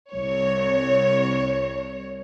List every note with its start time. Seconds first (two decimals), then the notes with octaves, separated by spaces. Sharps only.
0.14 C2 C#5